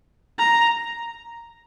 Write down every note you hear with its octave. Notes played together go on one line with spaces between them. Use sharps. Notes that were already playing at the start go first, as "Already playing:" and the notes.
A#5